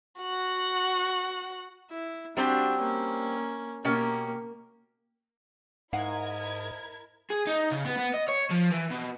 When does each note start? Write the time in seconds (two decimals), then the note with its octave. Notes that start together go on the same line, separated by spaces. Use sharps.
0.20 F#4 F#5
1.91 E4
2.37 G3 C4 D4 F#4 G4
2.81 A#3 C#4
3.85 B2 A#3 C#4 G4
5.93 G#2 E4 A#4 D#5 F5 F#5 G#6
7.30 G#4
7.47 D#4
7.72 C#3
7.85 B3
7.97 B3
8.14 D#5
8.29 C#5
8.51 F3
8.72 E3
8.91 B2